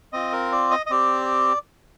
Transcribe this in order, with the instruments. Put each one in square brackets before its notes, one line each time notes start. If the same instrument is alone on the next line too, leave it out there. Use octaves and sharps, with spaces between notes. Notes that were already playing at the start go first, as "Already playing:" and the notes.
[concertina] C4 F4 D#5
A#4
D5
D#5
D#5
C4 G4 D5